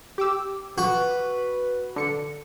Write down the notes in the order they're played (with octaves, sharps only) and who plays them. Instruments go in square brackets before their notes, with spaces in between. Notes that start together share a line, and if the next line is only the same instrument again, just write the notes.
[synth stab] G4 D6 E6
[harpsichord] F#4 [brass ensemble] B4
[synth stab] D3 C#7